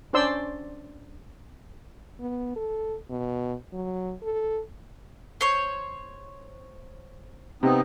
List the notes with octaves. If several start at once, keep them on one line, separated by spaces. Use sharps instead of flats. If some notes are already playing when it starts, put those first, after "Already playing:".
C#4 D4 C5 D5 C6 E6
B3
A4
B2
F#3
A4
C5 C#5
C3 B3 C4 D#4